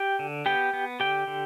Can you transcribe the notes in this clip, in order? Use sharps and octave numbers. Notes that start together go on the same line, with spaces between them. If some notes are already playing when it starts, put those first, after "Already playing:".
Already playing: G4 G5
D3
B3 G4 G5
B3
D3 G4 G5
D3